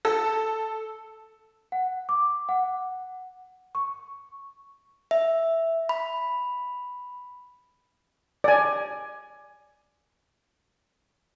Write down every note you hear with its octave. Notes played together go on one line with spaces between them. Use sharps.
A4
F#5
D6
F#5
C#6
E5
B5
D5 G#5